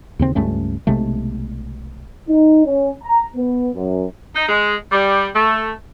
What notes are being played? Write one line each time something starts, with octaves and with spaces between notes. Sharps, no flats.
D#2 C#3 C4
C#2 G2 A3 C#4
B1 C3 G#3 A3
D#4
C#4
A#5
B3
F#2
D#4
G#3
G3
A3